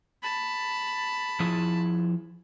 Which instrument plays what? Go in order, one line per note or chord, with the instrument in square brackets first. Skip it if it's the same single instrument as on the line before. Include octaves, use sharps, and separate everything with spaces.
[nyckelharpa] A5 B5
[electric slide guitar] F3 E4 G#4